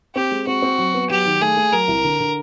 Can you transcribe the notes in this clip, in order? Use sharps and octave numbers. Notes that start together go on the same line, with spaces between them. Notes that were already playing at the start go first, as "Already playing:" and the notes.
C4 G4
G#3
C4 F#4
C4
F#3
B3
F#3 G4
D#3
A3 G#4
A3
F#3 A#4
C2
D3
D3